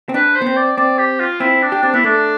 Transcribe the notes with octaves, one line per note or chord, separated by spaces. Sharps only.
C4
D4 B4
C5
B3
C4
D5
C4 D5
G4
F4
C4 E4
D4
G4
C4 D4
B3 E4
A3 D4